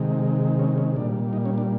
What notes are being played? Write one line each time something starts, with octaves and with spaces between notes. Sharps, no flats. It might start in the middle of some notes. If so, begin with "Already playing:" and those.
Already playing: C3 D#3 G#3
C#4
C#4
A#2 G3 D4
D#4
C#4
D4